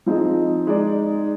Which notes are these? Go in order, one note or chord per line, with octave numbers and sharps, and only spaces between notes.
F3 C4 D#4 G#4 D#5
G#3 D#4 G#4 D5